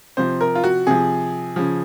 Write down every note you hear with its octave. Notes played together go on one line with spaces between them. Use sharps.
C3 F3 C5
A#4
F4
F#4
C3 F3 G#4
C#3 F3